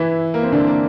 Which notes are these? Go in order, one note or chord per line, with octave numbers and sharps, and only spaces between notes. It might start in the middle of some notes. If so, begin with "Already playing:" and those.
Already playing: E3 E4
A#3
C4
D3 D4
A#3